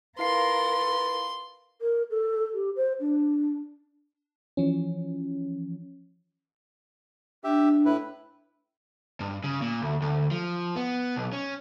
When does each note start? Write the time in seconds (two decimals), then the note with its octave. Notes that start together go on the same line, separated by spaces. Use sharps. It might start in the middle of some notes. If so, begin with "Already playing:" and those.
0.19 E4 F4 A#4 B4 F5 C6 C7
1.81 A#4
2.11 A4
2.54 G4
2.76 C5
3.00 D4
4.57 E3 F3 C#4
7.44 D4 G4 E5
7.85 A2 E4 B4
9.20 G2
9.44 C#3
9.62 A#2
9.82 D2
10.02 D2
10.31 F3
10.76 B3
11.16 B1
11.33 C#4